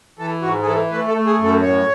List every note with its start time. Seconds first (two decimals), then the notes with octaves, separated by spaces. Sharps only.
0.19 E3 A4
0.42 G#2 F#4
0.62 G#4
0.66 E3 A4
0.91 A3 B4
1.08 A4
1.15 A3
1.27 G#4
1.38 F#2
1.44 A4
1.62 A2 C#5